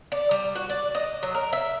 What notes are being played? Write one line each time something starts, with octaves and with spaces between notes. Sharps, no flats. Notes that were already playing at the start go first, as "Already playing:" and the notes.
D5
G3
F#4
D5
D#5
F#3
A#4
E5